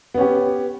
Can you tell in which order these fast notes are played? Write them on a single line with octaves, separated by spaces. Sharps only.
B3 C#4 G4